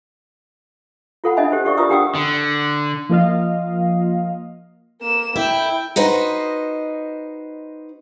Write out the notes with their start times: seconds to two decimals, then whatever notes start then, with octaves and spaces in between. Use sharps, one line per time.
1.24 F4 A4 F#5 B5
1.37 C#4 D4 D#5 E5 G#5 B5
1.52 G4 A4 C5
1.65 G4 A4 D5 E5 C#6
1.77 F4 A#4 D5 A#5 D#6 E6
1.90 D4 G4 F#5 G5 D#6 E6
2.15 D3
3.09 F3 A#3 F4 D#5 F5
5.01 A#3 E7
5.36 E4 G5
5.96 D#4 F#4 B4 C5 D#5